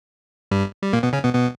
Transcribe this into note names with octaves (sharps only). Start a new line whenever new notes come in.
G2 G3
G3
A#2 A#3
B2 B3
C#3 C#4
B2 B3
B2 B3